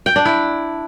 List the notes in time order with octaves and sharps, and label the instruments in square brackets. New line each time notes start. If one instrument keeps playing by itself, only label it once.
[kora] G5
D4
E4